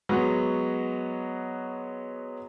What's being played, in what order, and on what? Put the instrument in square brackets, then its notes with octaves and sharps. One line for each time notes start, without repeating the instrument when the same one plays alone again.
[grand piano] F#3 G#3 B3 F#4 F#5